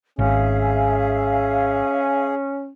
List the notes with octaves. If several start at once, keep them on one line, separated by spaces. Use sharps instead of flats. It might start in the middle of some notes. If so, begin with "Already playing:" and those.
G#1 C#4 G#4 E5 F5 G#5